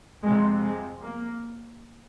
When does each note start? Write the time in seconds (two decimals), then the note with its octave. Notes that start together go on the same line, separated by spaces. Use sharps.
0.23 F2 C3 G#3
0.62 G#3
1.01 A#3